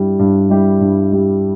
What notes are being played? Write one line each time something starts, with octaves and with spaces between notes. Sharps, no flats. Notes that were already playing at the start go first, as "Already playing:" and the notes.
Already playing: G2 G3 E4 G4
G2
G3 E4 G4
G2
G3 E4 G4